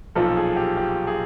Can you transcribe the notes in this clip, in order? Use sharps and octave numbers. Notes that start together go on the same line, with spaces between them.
B1 A#2 F3 A4
G#4
G4
G4
G#4